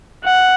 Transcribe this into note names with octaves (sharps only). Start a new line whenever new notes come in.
F#5